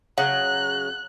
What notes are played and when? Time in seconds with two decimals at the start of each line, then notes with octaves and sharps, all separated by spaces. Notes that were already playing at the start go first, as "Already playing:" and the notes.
0.18 C#3 F#3 F#5 F#6